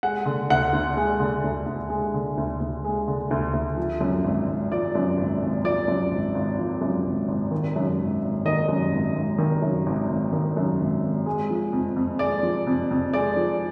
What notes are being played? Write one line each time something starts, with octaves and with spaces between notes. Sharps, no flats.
G#3 F#5
D3
D2 F#5
D2
G#3
D3
D2
D2
G#3
D3
D2
D2
G#3
D3
D2
D2
F3
F#2
G#1
G#1
F3 D5
F#2
G#1
G#1
F3 D5
F#2
G#1
G#1
F3
F#2
G#1
G#1
D#3
F#2
G#1
G#1
D#3 D#5
F#2
G#1
G#1
D#3
F#2
G#1
G#1
D#3
F#2
G#1
G#1
G#3
F3
F2
F2
G#3 D5
F3
F2
F2
G#3 D5
F3